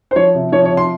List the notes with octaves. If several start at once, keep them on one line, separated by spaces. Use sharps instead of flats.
C5
F3 C#5
C3
F3 C#5
C#5
C3
C6